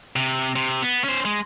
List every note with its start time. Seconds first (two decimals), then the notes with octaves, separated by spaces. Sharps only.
0.16 C3
0.56 C3
0.82 B3
1.04 C#4 C5
1.25 G#3